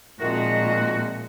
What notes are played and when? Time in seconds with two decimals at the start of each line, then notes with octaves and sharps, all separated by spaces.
0.20 A#2 D#3 F3 G#3 C4 F#4 E5